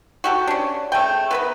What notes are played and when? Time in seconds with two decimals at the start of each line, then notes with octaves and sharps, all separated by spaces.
0.24 F#4 G4 A4
0.47 C#4 D4
0.92 A3 G#4 G5
1.31 B3 A#4 B4